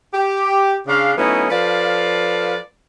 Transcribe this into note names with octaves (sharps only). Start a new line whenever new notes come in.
G4
C#3 D4 F5
F#3 A3 B3 C#4 D#4 E4
F3 A4 B4 D5 F5